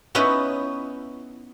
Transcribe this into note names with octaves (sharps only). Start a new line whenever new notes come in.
B3 C#4 D#4 E4 B4